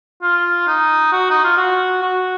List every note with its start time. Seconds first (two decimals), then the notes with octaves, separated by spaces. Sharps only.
0.22 F4
0.67 D#4
1.12 F#4
1.30 D#4
1.44 F4
1.57 F#4
2.02 F#4